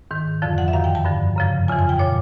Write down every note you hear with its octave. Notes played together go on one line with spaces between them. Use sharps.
G#2 D#3
F2 D3 F3
F#5
E5
F#2 D#3 F5
G5
A5
G2 D3 F3
F#2 C#3 F3
F2 C#3 E3 G#5
G#5
G5
A#2 F3 C#5